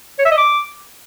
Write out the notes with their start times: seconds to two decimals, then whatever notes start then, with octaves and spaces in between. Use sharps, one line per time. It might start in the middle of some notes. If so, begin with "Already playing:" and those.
0.19 C#5
0.25 E5
0.31 D#5
0.38 D6